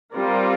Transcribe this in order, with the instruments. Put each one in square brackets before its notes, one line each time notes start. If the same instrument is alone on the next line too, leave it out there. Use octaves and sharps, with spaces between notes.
[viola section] G3 C4 F4 A#4 D5